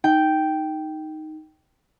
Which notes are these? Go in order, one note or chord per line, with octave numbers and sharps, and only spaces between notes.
D#4 G5